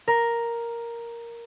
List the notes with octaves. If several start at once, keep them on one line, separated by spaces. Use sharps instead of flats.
A#4